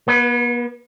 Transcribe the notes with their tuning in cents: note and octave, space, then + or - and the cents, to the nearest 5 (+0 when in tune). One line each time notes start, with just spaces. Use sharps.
B3 -45 B4 +0